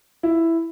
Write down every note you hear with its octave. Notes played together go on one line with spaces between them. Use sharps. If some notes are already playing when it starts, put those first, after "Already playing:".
E4